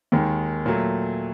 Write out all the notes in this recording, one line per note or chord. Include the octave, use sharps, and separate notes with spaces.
D#2 D#3 G#3
A#2 F#3 A3